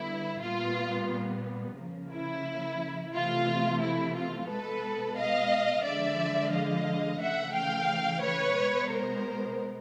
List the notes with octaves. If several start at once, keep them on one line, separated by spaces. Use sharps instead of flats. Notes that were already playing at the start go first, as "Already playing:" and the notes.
Already playing: D3 G3 B3 E4
A#2 G3 B3 F4
C#3 F3 A#3
E4
C3 E3 A3 F4
E4
F4
B2 G#3 B3 A4 B4
D#5 F5
D3 F3 G#3 D5 E5
D#5 F5
C#3 E3 A3 E5 F#5
F5 G5
B4 C#5
B2 G#3 B3
A#4 C5